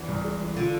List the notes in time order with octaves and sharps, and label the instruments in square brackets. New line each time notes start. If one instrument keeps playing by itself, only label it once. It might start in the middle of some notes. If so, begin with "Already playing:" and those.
Already playing: [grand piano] E2 E3
C2
G#3
E3
[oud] D3 [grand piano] F4